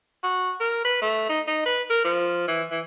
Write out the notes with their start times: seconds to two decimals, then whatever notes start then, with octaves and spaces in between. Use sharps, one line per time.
0.24 F#4
0.60 A#4
0.85 B4
1.02 A3
1.29 D#4
1.47 D#4
1.66 B4
1.90 A#4
2.04 F3
2.48 E3
2.71 E3